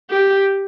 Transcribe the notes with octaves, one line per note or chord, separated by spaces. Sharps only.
G4